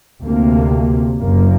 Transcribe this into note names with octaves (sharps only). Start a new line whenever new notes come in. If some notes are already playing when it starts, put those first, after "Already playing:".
D2 C3 A#3
F#1 F#2 A#3